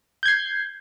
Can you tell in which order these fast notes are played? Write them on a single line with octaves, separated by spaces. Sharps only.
G6 G#6 C7